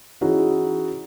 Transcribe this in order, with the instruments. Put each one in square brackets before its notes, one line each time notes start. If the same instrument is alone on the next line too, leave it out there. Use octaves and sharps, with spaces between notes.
[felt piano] E3 C#4 D#4 E4 F#4 G#4